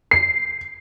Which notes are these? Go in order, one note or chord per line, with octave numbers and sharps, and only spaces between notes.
C7